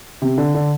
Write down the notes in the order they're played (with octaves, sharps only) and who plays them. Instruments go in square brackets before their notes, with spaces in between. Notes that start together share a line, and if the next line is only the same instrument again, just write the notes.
[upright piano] C3
D3
D3